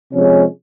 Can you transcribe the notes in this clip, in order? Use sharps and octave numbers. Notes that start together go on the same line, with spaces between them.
C3 F3 G#3 C#4